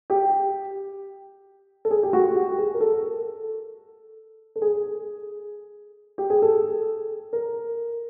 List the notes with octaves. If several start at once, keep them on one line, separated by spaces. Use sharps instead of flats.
G4
A4
G#4
G4
F#4
G4
G#4
A#4
A4
A4
G#4
G4
G#4
A4
A#4